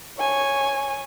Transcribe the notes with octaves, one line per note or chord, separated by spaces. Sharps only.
C#5 G#5